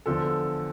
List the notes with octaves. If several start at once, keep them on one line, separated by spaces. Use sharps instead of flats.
E2 D3 F3 A4